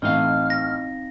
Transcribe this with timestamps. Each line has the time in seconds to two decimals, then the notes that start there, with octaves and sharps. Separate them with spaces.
0.02 A1 A3 C4 D#4 F5 F6
0.50 A#6